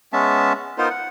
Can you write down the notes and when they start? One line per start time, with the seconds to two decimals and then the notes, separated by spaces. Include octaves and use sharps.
0.13 G#3 B3 C#4 E5 A5
0.78 B3 D#4 F4 A#4 C5
0.90 F#5